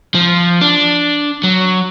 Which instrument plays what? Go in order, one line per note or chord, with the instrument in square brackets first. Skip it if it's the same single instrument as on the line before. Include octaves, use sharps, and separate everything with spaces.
[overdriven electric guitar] F3
D4
F#3